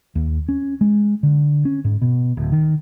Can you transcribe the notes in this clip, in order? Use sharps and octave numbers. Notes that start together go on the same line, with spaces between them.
D#2
C#4
G#3
D3
C#4
G#2
B2
D1
D#3